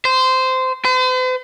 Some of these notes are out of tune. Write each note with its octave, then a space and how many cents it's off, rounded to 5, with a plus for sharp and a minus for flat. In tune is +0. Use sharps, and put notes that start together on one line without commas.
C5 -15
C5 -45